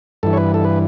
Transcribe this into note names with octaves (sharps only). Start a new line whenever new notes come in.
G2 E3 A4
C#5
B4
A4
B4